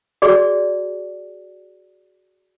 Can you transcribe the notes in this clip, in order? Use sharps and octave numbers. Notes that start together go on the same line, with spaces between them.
F#4 G#4 D5